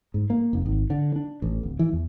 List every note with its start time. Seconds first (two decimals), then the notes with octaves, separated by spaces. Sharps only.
0.14 G#2
0.30 A#3
0.53 F1
0.66 G#1
0.90 D3
1.16 D4
1.42 A1
1.63 D1
1.79 E3
1.93 E2